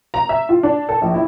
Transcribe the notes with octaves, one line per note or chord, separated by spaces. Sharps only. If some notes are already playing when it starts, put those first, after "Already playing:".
A#5
E5
F4
D4
A4
A#1
E4